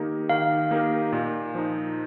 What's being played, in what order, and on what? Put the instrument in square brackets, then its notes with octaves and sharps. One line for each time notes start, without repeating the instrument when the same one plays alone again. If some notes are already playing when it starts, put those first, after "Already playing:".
Already playing: [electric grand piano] D#3 A#3 D#4 G4 A#4
[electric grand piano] D#3 [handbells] F5
[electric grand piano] A#3 D#4 G4 A#4
A#2
F3 D#4